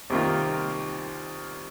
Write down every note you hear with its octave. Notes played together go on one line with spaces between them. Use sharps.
C2 C3 D#3 A#3 F4